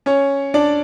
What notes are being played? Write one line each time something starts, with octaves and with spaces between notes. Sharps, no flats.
C#4 C#5
D4 D5